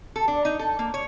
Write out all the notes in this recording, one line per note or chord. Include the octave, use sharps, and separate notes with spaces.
A4
D4
D#4
A4
A#3
C#5